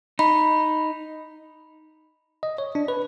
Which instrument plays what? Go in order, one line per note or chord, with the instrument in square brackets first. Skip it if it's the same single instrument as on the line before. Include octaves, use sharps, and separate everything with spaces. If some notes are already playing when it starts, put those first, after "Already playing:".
[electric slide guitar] D#4 [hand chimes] B5
[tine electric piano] D#5
C#5
D4
B4